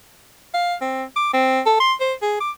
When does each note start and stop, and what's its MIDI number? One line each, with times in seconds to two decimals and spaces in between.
0.54 0.74 77
0.81 1.04 60
1.16 1.29 86
1.33 1.61 60
1.66 1.80 69
1.80 1.94 84
2.01 2.14 72
2.22 2.37 68
2.40 2.51 86